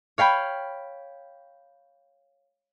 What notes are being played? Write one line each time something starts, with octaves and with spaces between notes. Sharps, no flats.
C#5 F5 G5 B5